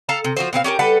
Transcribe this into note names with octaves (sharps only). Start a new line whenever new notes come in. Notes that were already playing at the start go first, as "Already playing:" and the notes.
A4 F5 A5 A#5
C3
F3 F#4 C5
B2 C4 G#4 F5
C#4 G4 A4 A#4
G3 A4 B4 F#5